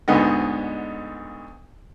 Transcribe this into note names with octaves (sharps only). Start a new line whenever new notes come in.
D2 G#2 D3 B3 D#5